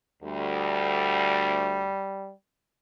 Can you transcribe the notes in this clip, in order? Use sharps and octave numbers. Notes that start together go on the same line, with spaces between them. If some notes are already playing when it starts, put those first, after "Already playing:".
D2 G3